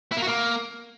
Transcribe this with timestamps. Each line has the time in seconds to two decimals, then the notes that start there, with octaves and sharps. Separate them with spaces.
0.12 E4
0.17 A#3
0.22 F#4
0.27 A#3